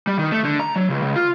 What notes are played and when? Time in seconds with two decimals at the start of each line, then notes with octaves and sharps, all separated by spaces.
0.07 G3
0.19 D#3
0.32 A3
0.44 D3
0.60 A#5
0.76 F#3
0.90 C#2
1.02 C#2
1.16 F4